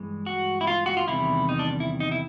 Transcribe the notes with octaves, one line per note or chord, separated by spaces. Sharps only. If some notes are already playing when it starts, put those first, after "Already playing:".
Already playing: G2 E3 G#3
F#4
E4
F4
F#4
F4
E2 C3 D#3 G3 E4
D#4
D4
E4
D#4
E4